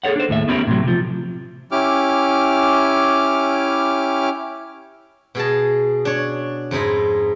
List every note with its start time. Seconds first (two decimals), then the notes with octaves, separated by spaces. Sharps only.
0.04 G#4 A4 C#5 F#5
0.16 D4 C5
0.29 D#2 A2 E5
0.48 B3 C#4 E4 G4 A#4
0.67 A2 C3 F3 F#3
0.84 C3 F3
1.72 C#4 E4 G4 D6 F6
5.35 B2 G#4 D#5 A5
6.05 D4 C#5
6.71 F2 G#2 D#4 E4